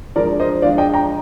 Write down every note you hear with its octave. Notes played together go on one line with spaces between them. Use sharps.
F3 G#3 D4 A#4 D5
C5 D#5
F3 G#3 D4 D5 F5
D#5 G5
G5 A#5